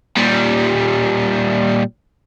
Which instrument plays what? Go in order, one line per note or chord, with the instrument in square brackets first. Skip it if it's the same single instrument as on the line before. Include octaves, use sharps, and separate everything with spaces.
[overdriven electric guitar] A#2 G3